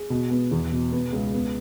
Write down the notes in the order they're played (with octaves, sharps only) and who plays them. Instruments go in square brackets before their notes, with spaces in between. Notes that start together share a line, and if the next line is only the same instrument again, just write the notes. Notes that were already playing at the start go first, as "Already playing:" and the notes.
Already playing: [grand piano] G#4
B2
B3
E2
B2
B3
C#2
B3